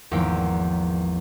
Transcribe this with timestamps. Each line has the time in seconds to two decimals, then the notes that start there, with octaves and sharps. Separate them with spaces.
0.11 G#1 E2 F3 A#3 G5